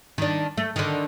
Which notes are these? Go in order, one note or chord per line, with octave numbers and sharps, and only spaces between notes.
D#3 D4
A3
D3 D#3